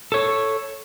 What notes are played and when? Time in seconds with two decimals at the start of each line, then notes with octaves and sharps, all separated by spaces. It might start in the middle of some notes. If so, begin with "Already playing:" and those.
0.12 A4 C#5